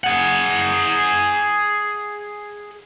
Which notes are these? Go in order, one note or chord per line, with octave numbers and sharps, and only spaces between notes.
G#4 F#5